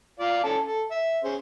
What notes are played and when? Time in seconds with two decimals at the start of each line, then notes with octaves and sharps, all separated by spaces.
0.20 F4 D5 F5
0.44 C#4 A4 A5
0.66 A4
0.91 E5
1.24 C#4 G#4 C5